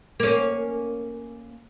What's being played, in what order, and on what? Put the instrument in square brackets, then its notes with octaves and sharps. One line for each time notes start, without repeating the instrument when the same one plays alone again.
[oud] A#3 C#4